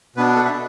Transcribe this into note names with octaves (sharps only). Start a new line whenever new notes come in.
B2 B3 D4 B4
A4
E5